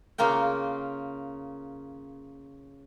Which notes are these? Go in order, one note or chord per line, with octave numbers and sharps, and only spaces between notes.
C#3 A#3 F4 A#4 G5